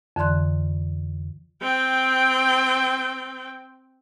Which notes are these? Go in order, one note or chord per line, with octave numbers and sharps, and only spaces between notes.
F2 D3 E3 D5 C6 F#6
C4 G5